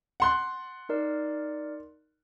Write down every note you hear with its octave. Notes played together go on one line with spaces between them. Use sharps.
F#5 C6 F#6
D#4 A#4 D5